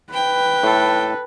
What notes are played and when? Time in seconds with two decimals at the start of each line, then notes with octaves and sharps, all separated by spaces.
0.13 B4 G5
0.63 A2 A4